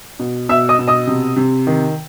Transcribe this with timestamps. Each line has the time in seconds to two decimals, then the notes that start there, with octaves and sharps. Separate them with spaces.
0.19 B2
0.49 B2 E5 E6
0.69 D#5 D#6
0.79 B2
0.88 D#5 D#6
1.07 C3
1.36 C3
1.67 D#3